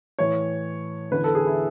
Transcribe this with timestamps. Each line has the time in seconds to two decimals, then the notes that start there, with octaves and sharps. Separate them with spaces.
0.18 A2 E3 C#5
1.11 E2 D3 B4
1.24 A4
1.35 G#4
1.47 E4